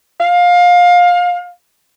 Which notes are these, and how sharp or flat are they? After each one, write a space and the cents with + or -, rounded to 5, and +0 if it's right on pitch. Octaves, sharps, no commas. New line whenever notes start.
F5 +25